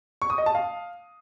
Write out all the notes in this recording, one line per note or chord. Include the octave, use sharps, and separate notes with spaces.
C#6
D#6
D#5
A5
F5